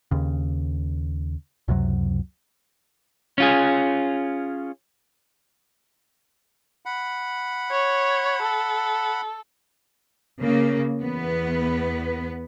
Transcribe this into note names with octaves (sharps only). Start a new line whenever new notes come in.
D#2 C#3
C#2 F#2 C3 F#3
C#4 F4 G#4
F#5 B5
C#5
A4
C#3 A#3
E2 B3 B4